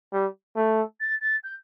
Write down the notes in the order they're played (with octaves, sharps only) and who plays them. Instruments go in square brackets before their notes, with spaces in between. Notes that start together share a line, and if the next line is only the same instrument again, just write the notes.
[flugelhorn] G3
A3
[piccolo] A6
A6
G6